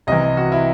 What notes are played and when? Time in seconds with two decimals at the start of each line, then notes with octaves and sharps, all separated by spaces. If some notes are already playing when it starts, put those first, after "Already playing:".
0.07 C2 C3 E3 D#5
0.37 F#4
0.52 E4